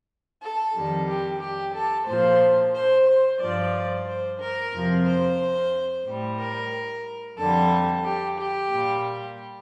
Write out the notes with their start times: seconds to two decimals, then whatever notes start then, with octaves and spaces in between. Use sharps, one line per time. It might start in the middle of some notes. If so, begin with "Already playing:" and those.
0.42 A4
0.75 F2 D#3 G3
1.09 G4
1.41 G4
1.74 A4
2.08 A#2 F3 C5
2.74 C5
3.08 C5
3.41 G2 F3 D5
4.07 C5
4.40 A#4
4.74 F2 C3 F3
5.06 C5
6.06 A2 G3
6.40 A#4
7.38 F2 D3 G3 A4
8.04 G4
8.39 G4
8.72 A#2 G3